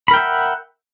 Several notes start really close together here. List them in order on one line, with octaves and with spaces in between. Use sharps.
B5 A#4 G5 E5 F#5